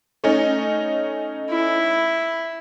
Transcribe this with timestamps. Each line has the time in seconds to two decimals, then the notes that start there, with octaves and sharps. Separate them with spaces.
0.24 A3 C#4 D#4
1.50 E4